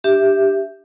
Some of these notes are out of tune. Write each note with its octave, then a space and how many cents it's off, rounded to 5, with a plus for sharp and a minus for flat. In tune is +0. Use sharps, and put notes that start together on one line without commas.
D4 +15 G4 +0 E5 +0